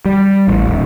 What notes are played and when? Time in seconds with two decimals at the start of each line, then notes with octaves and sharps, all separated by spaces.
0.05 G3
0.48 A1
0.67 D#1